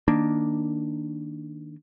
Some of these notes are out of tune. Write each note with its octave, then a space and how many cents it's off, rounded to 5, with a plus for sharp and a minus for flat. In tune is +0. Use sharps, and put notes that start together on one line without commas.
D#3 +0 A#3 +0 D4 +0